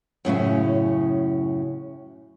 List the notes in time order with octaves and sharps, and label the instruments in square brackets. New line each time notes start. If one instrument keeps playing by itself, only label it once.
[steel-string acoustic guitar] F#2 A2 C#3 C#4